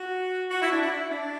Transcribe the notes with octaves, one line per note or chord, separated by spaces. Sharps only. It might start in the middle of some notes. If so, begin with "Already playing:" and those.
Already playing: F#4
F#4
E4
D4
E4
D4